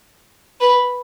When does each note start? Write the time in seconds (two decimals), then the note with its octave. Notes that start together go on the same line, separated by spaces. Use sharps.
0.60 B4